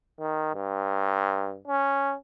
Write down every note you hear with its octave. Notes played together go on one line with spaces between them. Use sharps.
D#3
G2
C#4